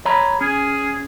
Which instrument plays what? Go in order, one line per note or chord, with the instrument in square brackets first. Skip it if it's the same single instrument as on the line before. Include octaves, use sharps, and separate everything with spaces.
[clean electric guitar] C#5 A#5 B5
[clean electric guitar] C#4 [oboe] G#4